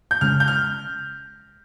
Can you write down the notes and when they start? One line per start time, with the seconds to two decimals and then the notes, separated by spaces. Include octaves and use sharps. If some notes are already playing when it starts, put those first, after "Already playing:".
0.11 G6
0.21 C#3 G#3 C#4 F6
0.40 G6
0.48 F6